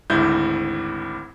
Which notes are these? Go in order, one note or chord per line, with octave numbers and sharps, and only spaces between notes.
G#1 D2 G#2 E4 G6